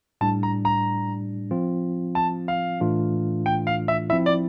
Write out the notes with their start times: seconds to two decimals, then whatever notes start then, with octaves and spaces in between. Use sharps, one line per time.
0.21 A2 G3 D4 A5
0.43 A#5
0.65 A#5
1.51 F3 C4 F4
2.15 A5
2.48 F5
2.80 A2 E3 A3 D4 F4
3.46 G5
3.67 F5
3.88 E5
4.10 E4 E5
4.12 F3 C4
4.26 D5